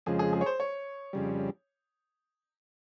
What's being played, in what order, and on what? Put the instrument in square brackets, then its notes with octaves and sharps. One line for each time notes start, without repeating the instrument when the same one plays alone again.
[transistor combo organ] F2 C#3 F3 G#3 [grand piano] G#4
[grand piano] G#4
G#4
C#5
C5
C#5
[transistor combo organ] F2 C#3 G3